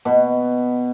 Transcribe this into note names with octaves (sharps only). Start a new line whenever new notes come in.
B2 B3